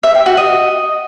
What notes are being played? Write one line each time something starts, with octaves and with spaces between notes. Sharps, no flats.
E5
G5
F#4
D#5